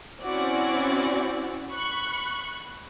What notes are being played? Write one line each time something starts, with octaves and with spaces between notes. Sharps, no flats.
C4 C#4 E4 F#4 D5
B5 C#6 F#6